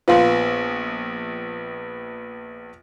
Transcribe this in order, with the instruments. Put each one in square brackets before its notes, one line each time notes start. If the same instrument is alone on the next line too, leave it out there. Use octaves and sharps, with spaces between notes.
[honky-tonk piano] A#1 B3 [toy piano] F4 F5 C6